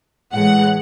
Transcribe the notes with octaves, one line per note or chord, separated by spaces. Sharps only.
A2 E3 G#3 F#5